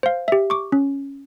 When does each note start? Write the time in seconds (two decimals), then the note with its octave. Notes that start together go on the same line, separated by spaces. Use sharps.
0.03 C5 F5
0.28 G4 E5
0.50 C#6 D6
0.72 C#4